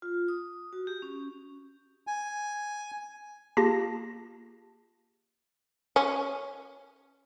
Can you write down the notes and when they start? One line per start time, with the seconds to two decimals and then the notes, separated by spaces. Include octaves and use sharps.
0.02 F4
0.28 D#6
0.73 F#4
0.87 G4
1.02 C#4
2.07 G#5
3.57 A#3 F4 G4 G#4 A5 A#6
5.96 C#4